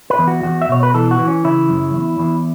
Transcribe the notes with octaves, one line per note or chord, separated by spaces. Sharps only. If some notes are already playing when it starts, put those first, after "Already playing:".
B4
E2
F#4
E2 F#4
E5
B2 C#5
B4
E3 A4
F#4
E3
C#4
C#3 E4
F#2
E2
E2